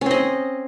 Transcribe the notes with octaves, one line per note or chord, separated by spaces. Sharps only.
C4 C#4 D#5